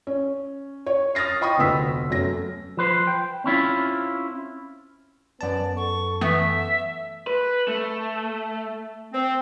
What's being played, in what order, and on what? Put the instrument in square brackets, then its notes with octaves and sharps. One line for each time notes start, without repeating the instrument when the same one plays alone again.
[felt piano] C#4
C#5
D#6 F6 A6 A#6 C7
D#5 G5 B5 C#6 D#6
F1 D2 B3 E6 B6
F#2 A3 A#6
[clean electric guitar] F3 B4 C5
G5
C4 C#4 E4 F4
[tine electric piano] F#2 A5 [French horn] B3 [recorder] D5
[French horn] A4 [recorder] C#6
[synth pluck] E3 A3 B3 [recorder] E5
[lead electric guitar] B4
A3
[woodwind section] C4